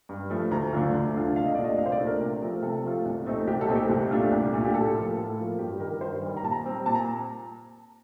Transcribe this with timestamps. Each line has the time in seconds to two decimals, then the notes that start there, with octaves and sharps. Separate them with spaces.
0.09 G2
0.30 F3 A3
0.51 D2 A#5
0.73 D3 A3 D4 F4
0.94 D2
1.14 D3 A3 D4 F4
1.36 C2 F5
1.45 D#5
1.55 A#2 A3 D4 F4 D5
1.64 D#5
1.78 C2 F5
1.86 C5
1.92 D5
1.99 A#2 A3 D4 F4
2.06 A#4
2.21 C3
2.42 F3 A3 C4 F4
2.62 C3 A4
2.84 F3 A3 C4 F4
3.05 C2
3.26 A#2 A3 C4 D#4
3.47 C2 G4
3.61 A4
3.69 A#2 A3 C4 D#4
3.75 G4
3.90 C2
4.11 A#2 A3 D4 F4
4.31 C2
4.53 A#2 A3 D4 F4
4.65 G4
4.74 A2 A4
4.95 F3 A#3 F4
5.17 A2 A4
5.38 F3 A#3 F4
5.59 G2 G4
5.80 D#3 G3 A#4
5.91 A#4
6.01 G2 C5
6.22 D#3 G3
6.37 A#5
6.43 A#2 A5
6.52 A#5
6.64 G3 C4
6.86 A#2 A5
6.95 A#5